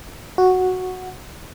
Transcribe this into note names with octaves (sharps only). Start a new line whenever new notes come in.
F#4